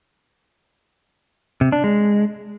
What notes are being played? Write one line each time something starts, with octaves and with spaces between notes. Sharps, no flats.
C3
D4
G#3